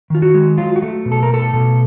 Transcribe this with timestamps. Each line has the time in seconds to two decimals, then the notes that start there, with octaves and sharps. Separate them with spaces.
0.10 D#3 F4
0.22 F#4
0.34 G#3
0.58 F#3 F4
0.76 F#4
0.82 A3
1.06 B2
1.12 A4
1.23 A#4
1.29 A3 A4
1.53 B2